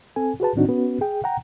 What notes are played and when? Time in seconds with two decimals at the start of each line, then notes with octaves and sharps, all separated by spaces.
0.16 C4 A4 G#5
0.40 F#4 G#4 B4 A5
0.56 A2 D#3 C4 D4 D#4 F#4
0.69 B3 C#4 F#4 B4
1.01 G#4 G5
1.24 F#5 G5 A#5